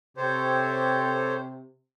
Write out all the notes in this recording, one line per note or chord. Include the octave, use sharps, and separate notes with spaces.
C3 G4 A4 C5 C#5